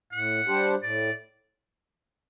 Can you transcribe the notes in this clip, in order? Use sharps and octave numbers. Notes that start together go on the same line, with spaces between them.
A2 F#5
G3 D4 G4 C5
A2 D5